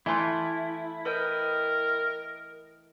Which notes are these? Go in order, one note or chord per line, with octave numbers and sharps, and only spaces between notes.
E3 A3 E4 F4
A#4 B4 D#5 G5